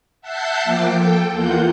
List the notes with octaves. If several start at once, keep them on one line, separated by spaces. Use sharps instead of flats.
E5 F#5 A5 F#6 G6 C7
F3 A#3 G5 D6
A4 G5
E2 A#3 F4 F#5 G6